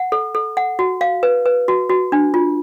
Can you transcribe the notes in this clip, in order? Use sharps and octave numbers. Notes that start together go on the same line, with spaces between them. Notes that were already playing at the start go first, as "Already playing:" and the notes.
Already playing: F#5
A4
A4
F#5
F#4
F5
B4
B4
F#4
F#4
D4
F4